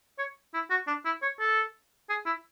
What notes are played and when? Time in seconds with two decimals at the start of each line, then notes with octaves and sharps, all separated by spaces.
0.19 C#5
0.54 E4
0.70 F#4
0.87 D4
1.05 E4
1.23 C#5
1.40 A4
2.10 G#4
2.26 E4